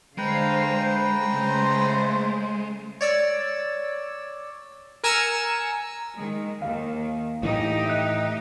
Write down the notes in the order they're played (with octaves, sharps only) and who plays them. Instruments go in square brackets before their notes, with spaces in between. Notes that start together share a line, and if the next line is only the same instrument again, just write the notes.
[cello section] D3 C5 F5 [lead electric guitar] G#3 [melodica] B4 G5 A#5
[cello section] C#3 A3 [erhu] C5
[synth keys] C#5 D5 E6
A#4 G#5 A#5 E6 C#7 E7
[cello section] D#3 G#3
[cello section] D#2 D#3 [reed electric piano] F5
[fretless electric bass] A2 E3 [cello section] D#4 G4 D#5
[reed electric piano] E5 F#6